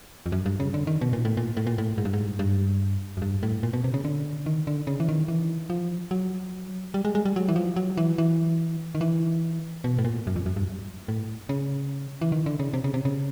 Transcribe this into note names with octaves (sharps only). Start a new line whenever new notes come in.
F2
F#2
G2
C#3
D3
D#3
B2
A#2
A2
A#2
A2
A#2
A2
G#2
G2
G#2
G2
F#2
G2
A2
A#2
B2
C3
C#3
D3
D#3
D3
C#3
E3
D#3
E3
F3
F#3
G3
G#3
G#3
G3
F#3
E3
F3
F#3
E3
E3
D#3
E3
B2
A2
A#2
F#2
F2
F#2
G2
A2
C#3
E3
D#3
D3
C#3
C3
C#3
C3
C#3